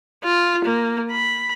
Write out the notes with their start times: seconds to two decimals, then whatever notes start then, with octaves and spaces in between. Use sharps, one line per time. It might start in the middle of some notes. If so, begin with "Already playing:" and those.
0.24 F4
0.64 A#3
1.12 B5